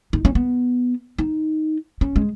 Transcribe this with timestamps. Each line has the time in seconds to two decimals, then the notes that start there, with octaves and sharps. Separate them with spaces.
0.13 D#4
0.25 C#4
0.35 B3
1.18 D#4
2.01 C#4
2.16 G#3